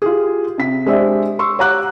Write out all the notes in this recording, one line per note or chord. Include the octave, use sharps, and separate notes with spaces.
F4 G4 G#4
C3 B6
G#3 D4 G4 C5 D5 E5
C6 C#6 E6
G4 C#5 F#5 A#5 D6 F#6